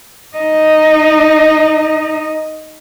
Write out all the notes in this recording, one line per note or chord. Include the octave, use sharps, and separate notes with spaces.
D#4 D#5